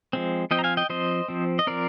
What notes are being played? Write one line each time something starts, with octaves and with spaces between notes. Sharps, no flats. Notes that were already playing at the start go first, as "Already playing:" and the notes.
F3 G#3 C4
F3 C4 D#5 G5
A#5
F5 G#5
D#5 G5
F3 C4 C5 D#5
F3 C4
D#5
F3 C4 A#4 D5